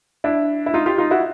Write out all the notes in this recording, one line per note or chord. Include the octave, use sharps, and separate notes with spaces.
D4 E4
E4
D#4 F4
F4 G4
D#4 F4
E4 F#4